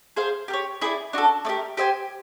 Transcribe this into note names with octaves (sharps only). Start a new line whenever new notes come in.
G#4 C5 F5
G4 A#4
C#5
E4 G#4 B4 D5
D4 F#4 A4
A3 D4 G4 A#4
G4 C5 E5 G#5